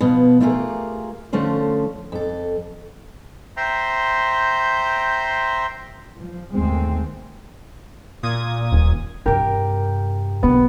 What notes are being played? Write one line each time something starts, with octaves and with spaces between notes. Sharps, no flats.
B2 F3 B3
A3 A#3 F4 G4 G#4 A#4
D3 F3 A3 C#4 C5
F2 A4
C5 E5 G5 A#5 C6
F3
G1 D#2 G#3 A3 C4
A#2 D#6 G#6
D#1
G2 C3 G4 A#4
B1 D3 B3